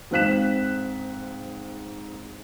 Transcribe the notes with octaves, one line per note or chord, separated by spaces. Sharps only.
G#2 C4 F5 F#6 B6 E7